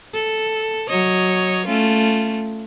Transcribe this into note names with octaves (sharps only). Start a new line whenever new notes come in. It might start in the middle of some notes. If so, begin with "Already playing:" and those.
A4
F#3 C#5 D#5
A3 C#4 F4